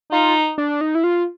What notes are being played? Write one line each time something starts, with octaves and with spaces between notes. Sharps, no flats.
D#4 F4
D4
D#4
E4
F4